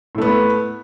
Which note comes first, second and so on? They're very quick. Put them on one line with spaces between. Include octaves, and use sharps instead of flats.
A2 A3 B3